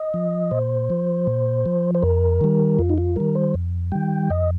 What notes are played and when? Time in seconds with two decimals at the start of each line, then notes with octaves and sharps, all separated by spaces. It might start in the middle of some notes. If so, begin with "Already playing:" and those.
Already playing: D#5
0.14 F3
0.51 A#2 C5
0.90 F3
1.27 A#2
1.66 F3
1.95 C5
2.02 F2 A#4
2.41 D#3 G3
2.79 F2 F4
2.90 D#4
2.98 F4
3.16 D#3 G3 A#4
3.35 C5
3.54 F2
3.92 D#3 G3 G5
4.30 F2 D#5